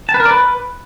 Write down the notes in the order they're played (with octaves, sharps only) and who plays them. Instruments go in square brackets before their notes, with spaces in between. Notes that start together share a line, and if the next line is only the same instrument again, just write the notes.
[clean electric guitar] A5
B4
A#4
D5
B4